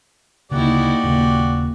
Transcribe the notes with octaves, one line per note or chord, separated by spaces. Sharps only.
D2 C#3 A#3 D#4 E4 F#4 G4 D5
D#1 A#2 C#3